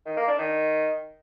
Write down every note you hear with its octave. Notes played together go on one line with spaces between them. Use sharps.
D#3
A#3
D4
D#3